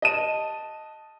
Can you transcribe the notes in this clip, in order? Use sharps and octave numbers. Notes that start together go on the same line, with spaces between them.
D#5 A5 D#7